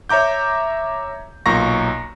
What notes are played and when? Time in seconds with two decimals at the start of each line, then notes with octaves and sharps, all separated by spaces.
0.09 C#5 E5 A#5 D6 G6
1.46 B1 A#2 A#5 C#6 A#6